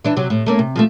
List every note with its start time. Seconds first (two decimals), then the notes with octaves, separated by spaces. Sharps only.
0.04 E3 D4 E4
0.16 C3 F#3
0.30 A2
0.46 A3 A#3 C#4
0.59 C3
0.76 F3 G#3 A3